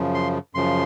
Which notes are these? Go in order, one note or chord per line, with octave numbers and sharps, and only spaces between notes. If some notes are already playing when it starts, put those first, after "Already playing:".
Already playing: F#2 C#3 F3
C6
F#2 C#3 F3 C6